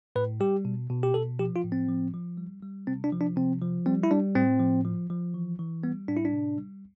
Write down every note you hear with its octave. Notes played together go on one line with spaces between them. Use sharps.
A2 B4
G3 G4
B2
B2
G4
B2 A4
F3 G4
F4
A2
C4
F3
F3
G3
G3
C3 C4
D4
F3
D4
C3 C4
F3
G3 C4
E4
G3 D4
A2 C4
F3
F3
F3
E3
E3
G3 B3
A2 D4
E4
D4
C3
G3